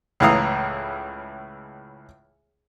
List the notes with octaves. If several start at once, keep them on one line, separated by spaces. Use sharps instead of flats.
C#2 A2 E3 F5 A#5 D#6